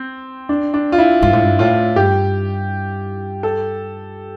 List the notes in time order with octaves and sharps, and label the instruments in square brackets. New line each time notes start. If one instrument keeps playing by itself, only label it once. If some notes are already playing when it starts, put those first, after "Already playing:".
Already playing: [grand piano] C4
D4
D4
F4
E4
[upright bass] G2 [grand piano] F4
[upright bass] A2
G2
[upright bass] A2 [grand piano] F4
[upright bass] G2 [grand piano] G4
[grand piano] A4